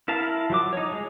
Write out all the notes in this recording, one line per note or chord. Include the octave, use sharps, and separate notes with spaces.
E4 A#4 F5 A5
F3 F#3 D6
D#4 C#5
G#3